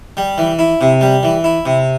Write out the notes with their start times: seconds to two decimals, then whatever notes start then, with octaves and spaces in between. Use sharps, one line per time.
0.17 G3
0.38 E3
0.59 E4
0.81 C3
1.01 G3
1.23 E3
1.44 E4
1.66 C3